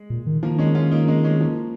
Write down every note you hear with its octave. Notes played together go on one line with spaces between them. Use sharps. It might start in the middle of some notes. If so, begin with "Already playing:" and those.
Already playing: G#3
A#2
D#3
D#3 F3 A#3
G#3 C#4
C#4 F4
A#3 D#4
G#3 C#4
G#3 C#4
F3 A#3